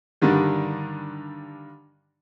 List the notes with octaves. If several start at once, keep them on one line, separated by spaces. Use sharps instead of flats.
G2 D3 D#3 G3